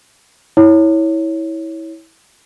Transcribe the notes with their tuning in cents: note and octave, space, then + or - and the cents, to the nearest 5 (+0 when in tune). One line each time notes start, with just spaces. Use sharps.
E4 -20 C#5 +0